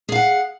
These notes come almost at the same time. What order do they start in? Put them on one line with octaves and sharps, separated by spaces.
G#4 F5 F#5